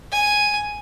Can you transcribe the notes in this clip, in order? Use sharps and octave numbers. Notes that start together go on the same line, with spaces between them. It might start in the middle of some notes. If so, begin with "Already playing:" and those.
G#5